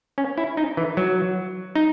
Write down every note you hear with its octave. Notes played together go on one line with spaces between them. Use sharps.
C#4
E4
D#4
E3
F#3
D#4